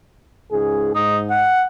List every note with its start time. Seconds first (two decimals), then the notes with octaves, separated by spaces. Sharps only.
0.52 C#2 G#2 G#4
0.95 G#2 D#4
1.30 F#5